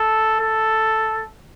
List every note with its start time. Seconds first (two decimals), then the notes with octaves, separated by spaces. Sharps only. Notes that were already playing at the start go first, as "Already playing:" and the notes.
Already playing: A4
0.40 A4